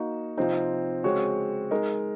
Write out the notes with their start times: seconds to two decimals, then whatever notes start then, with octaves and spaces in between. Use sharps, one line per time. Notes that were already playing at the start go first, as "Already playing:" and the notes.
Already playing: A#3 D#4 F#4
0.37 C3 F3 C4 D#4
1.04 C#3 G#3 C4 F#4 C#5
1.71 G#3 D#4 A#4 D#5